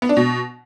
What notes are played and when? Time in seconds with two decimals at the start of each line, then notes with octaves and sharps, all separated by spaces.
0.02 B3
0.09 D4
0.17 B2